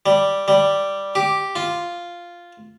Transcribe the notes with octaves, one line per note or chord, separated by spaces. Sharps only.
G3
G3
G4
F4